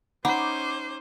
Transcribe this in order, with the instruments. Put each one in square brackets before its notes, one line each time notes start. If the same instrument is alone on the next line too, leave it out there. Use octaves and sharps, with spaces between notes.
[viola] C#4 C5 [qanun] D#4 [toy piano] F#5 B5 [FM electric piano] D6